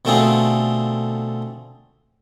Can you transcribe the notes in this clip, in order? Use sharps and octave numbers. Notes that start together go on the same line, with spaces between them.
B2 D3 A3 C4 F4 G#4